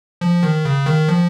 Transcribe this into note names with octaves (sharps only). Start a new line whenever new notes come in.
F3
D#3
C#3
D#3
F3